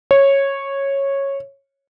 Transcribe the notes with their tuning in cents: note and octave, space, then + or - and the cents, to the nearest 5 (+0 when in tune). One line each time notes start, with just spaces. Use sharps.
C#5 -10